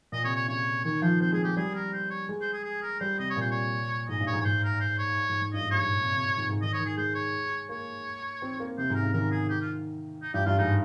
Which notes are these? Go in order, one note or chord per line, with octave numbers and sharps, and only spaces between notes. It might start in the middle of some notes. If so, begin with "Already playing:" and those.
A#2 D#5
C3 C#5
C#5
C#3 C#5
D#3 C#5
F3 C5
C4 C5
G#3 G#4
G#3 G4
G3 G#4
A#4
C5
C#5
G#3
C5
G#4
G#4
A#4
G3 C5
C3 D#5
C#5
A#2 C5
C#5
G#2 D#5
G2
C#5
G#2
C#5
G#2 C5
A#4
C5
C#5
G#2
G#2
G2 D#5
G#2
G2 C#5
G#2
A#2
C3
C3
C3
G#2
G#2
D#3 D#5
C#5
D#3
G#4
G#3 C5
C#5
A#3 C#5
C4
A#3
C3 C5
G#2
A#4
C#3
D#3 A#4
G#4
G4
F4
D#4
G2 G4
G2 F4
G#2 D#4